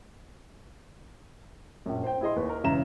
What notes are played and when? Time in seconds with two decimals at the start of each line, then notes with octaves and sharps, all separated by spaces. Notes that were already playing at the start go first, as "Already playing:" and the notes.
1.86 A#1 F#2
2.04 C5 G5
2.21 E4 G#4 D#5 C6
2.36 D#2 B4
2.49 A#4
2.64 E1 C#3 E3 E5 A#5 E7